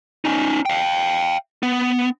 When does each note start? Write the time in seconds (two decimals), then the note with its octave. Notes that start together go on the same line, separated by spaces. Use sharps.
0.25 C#4 D#4
0.65 F5 G5
1.63 B3